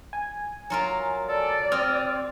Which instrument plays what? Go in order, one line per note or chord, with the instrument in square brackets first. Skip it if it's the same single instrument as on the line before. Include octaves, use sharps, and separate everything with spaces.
[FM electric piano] G#5
[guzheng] F#3 F4 A#4
[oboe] A4 [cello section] D5
[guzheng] C4 [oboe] D#6 [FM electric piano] F6